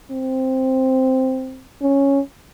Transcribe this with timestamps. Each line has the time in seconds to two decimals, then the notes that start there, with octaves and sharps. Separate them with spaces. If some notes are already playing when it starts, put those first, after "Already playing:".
0.11 C4
1.82 C#4